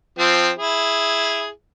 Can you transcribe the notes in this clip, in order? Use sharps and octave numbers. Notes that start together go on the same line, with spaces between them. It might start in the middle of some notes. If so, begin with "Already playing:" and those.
F3 C4
E4 G#4